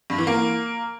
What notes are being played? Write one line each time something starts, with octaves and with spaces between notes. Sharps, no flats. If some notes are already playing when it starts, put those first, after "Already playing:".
G2
E3
A#3